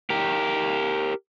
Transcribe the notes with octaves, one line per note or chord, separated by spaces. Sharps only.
G4 A#4